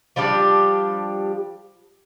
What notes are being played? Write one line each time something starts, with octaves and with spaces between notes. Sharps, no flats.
F3 G3 D4 G4